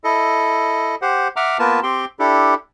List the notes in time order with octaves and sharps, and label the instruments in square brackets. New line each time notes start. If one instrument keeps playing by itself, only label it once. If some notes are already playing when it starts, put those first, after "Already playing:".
[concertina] E4 A4 D#5
G4 C5 F#5
E5 F#5 A#5 D6 F6
A#3 B3 F4 A#4 B4 A5
C4 G4 G5 C6
D4 E4 G4 A4